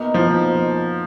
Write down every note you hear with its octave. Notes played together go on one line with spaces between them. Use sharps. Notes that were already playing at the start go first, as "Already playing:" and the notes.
Already playing: B2 A#3 D#4
F3